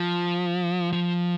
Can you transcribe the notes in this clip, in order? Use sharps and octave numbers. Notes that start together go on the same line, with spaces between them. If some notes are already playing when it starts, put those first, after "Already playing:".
Already playing: F3
F3